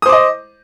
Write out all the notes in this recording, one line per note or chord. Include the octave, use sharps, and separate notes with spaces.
C5 D#5 D6 D#6